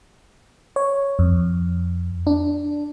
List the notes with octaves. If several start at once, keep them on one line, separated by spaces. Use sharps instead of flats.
C#5
F2
D4